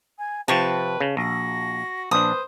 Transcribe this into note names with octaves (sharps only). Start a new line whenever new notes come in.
G#5
C3 F3 B4 G5 A5 C#6
C#3
A#1 F#4 A#6
A#1 D4 B4 C5 D#6